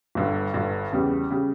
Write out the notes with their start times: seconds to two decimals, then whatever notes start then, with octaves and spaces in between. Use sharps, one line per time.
0.15 G1 G2 D3
0.54 G1 G2 D3
0.92 E2 C#3 G3
1.31 C#3 G3